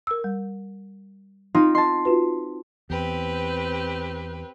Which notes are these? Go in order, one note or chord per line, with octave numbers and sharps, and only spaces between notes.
A#4 E6
G3
C4 D#4 F4
D#5 A5 C6
F4 F#4 B4
E2 C4 G4 B4